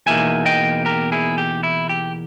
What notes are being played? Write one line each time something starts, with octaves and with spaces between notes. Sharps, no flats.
E2 B2 A#3 D#4 E5 G#5
D#5 G5
G4 A#4
E4 G#4
G4
E4
G4